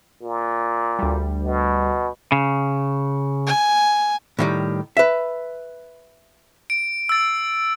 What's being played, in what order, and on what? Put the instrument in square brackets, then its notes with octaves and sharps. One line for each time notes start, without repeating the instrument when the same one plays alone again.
[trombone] A#2
[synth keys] D2 G3
[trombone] B2
[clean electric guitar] C#3
[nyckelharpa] G#5
[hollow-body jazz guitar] A2 D#3 G3
B4 E5
[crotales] D7
E6 A6